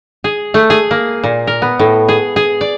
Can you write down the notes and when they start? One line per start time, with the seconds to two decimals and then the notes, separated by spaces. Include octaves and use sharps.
0.24 G#4
0.54 A3
0.70 G#4
0.91 A#3
1.23 A#2
1.47 A#4
1.62 B3
1.79 A2
2.09 G#4
2.36 G#4
2.61 D5